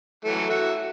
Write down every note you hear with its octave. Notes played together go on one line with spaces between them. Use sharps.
E3 F#3 A3
F#4 E5